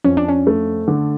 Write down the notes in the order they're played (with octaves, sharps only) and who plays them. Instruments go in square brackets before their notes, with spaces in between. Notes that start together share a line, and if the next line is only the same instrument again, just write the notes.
[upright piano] F2 [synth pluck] C#4
[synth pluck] D4
C#4
[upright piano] A3
D3